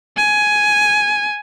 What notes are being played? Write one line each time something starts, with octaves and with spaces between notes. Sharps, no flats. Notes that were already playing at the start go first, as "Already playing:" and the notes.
G#5